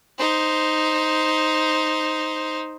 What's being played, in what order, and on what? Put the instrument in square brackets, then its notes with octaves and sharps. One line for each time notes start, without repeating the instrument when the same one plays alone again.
[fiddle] D#4 C5